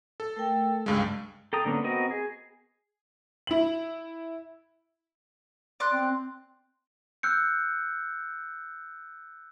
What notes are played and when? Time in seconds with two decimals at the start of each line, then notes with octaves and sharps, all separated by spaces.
0.20 A4
0.36 A3 A#4 G5
0.86 C#2 G2 G#3 F5 E6
1.53 A4 G5 A#5 D#6
1.65 D3 A#3 B3 C#4
1.84 B3 C4 F#4 A#4 D#5
2.11 G#4
3.47 E4 F#7
5.80 D5 C6 F#6
5.93 C4
7.23 E6 F#6 G6 C#7